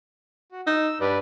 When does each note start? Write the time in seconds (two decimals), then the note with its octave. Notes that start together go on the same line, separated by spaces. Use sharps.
0.52 F#4
0.67 D#4 E6
1.01 G2 B4 D5